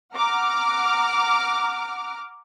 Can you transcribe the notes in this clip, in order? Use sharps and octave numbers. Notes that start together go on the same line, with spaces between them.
F#5 A#5 D6 F6